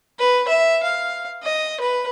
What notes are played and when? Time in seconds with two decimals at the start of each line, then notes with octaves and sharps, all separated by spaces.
0.18 B4
0.48 E5
0.83 F5
1.43 D#5
1.80 B4